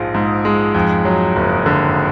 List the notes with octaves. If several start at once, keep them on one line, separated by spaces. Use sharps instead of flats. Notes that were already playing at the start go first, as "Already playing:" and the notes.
Already playing: A#1 G#2 F3 G#3
G#2
G#3
F2
F#3
F#1
D3